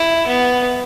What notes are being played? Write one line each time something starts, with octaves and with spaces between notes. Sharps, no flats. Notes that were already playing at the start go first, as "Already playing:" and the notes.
Already playing: E4
B3